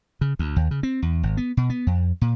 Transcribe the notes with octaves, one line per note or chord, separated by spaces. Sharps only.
C#3
D2
D#2
C#3
C4
E2
G#1
B3
B2
B3
F2
A#2